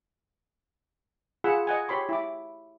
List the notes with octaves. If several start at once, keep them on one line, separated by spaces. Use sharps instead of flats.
F4 G#4 F#5 B5 E6
D#5 F#5 G#5
G4 C#5 B5 C6 D6
E4 B5 D6